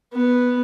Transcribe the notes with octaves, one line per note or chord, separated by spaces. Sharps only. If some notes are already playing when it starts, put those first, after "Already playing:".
B3